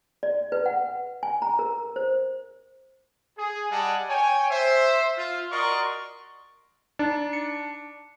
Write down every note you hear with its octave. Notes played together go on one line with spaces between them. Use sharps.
D5
B4
F#5
G#5
A#5
A#4
C5
G#4
G3 D5 D#5 F#5 G#5 A5
C#5 G5 G#5
C5 E5
F4
F#4 A#4 D5 D#5 C6 C#6
D4 D#4
C#7